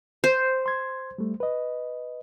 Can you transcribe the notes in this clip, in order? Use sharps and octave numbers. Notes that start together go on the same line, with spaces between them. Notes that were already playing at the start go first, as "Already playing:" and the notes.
C5
C6 G#6
G3 A3
B4 D#5